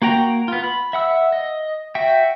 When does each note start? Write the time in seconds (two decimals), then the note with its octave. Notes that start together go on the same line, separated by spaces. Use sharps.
0.02 A#3 F#4 G5 A#5
0.48 B3 F4
0.64 B5
0.93 E5 F#5 E6
1.32 D#5
1.95 F#4 E5 G5